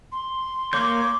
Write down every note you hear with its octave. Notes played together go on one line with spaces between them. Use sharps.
C6
A#3 C#5 D6 G6